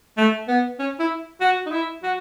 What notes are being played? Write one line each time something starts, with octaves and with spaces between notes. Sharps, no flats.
A3
B3
C#4
E4
F#4
D#4
E4
F#4